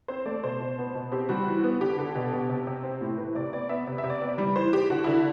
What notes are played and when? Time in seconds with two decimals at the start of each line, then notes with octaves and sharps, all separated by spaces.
0.08 C4 C5
0.26 A3 D5
0.43 B2 C5
0.60 B2
0.78 B3
0.95 B2
1.12 C4 G4
1.29 G3 F#4
1.47 E3
1.63 B3
1.81 D3 G4
1.99 D3
2.15 B2
2.32 B2
2.49 C3
2.67 C3
2.83 C4
3.01 A2
3.18 E3 B4
3.35 C3 D5
3.53 B3 D5
3.69 B3 E5
3.87 C3
3.98 E5
4.04 C3
4.10 D5
4.21 B3
4.38 G3
4.56 E3 C5
4.73 E3 G4
4.90 D3 F#4
5.04 D3 E4